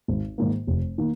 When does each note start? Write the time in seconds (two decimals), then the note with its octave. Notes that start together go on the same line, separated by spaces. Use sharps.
0.08 G#1
0.38 G#2 D#3 A#3
0.67 F1
0.98 D#3 A#3